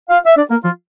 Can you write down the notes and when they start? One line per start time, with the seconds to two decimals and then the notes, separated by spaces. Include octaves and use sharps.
0.09 F4 F5
0.26 E5
0.37 D4 D5
0.50 A#3 A#4
0.64 F3 F4